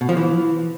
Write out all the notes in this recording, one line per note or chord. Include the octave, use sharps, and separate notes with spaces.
B2
F3
E3